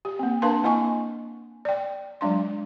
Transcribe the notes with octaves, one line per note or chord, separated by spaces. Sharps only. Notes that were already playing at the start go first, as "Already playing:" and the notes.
G4
A#3 C4
D4 A#4 B4 F5 A5 C6
A#3 E4 D#5 G#5 C#6
D5 G5
F#3 G#3 D4 C6